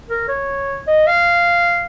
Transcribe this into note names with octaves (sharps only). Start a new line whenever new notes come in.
A#4
C#5
D#5
F5